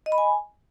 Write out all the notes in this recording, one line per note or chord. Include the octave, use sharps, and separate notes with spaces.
D#5
B5
G#5